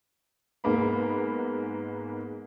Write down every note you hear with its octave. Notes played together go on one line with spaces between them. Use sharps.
G#2 G#3 A#3 B3 B5